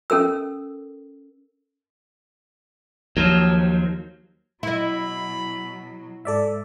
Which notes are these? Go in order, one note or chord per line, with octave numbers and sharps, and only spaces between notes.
C#4 A4 A#4 E6
D#2 F3 F#3
B2 F#3 E4 D#5 B5
G#2 A4 D5 E5